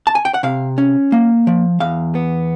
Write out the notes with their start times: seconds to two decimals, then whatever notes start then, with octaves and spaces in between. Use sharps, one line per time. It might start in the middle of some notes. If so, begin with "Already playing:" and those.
0.07 A5
0.15 G#5
0.25 G5
0.34 F#5
0.43 C3 F5
0.78 C#4
1.12 A#3
1.47 F3
1.80 E2 F5
2.15 B3